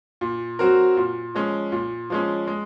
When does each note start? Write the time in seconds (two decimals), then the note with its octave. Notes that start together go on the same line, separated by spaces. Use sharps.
0.21 A#2
0.59 F#3 C4 F#4 A#4
0.97 A#2
1.35 F3 G#3 C#4
1.72 A#2
2.10 F3 G#3 C#4
2.47 G#3